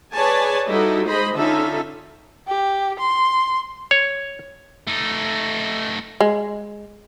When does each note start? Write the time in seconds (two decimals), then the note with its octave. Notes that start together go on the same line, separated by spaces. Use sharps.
0.13 G#4 B4 C#5 D5 G#5 A5
0.68 G3 D#4 E4 F#4 A4 D#5
1.07 G#3 G#4 C5 D#5 B5
1.36 D3 C#4 D#4 F4 A4 E5
2.47 G4
2.99 C6
3.91 C#5
4.87 A3 D#4
6.21 G#3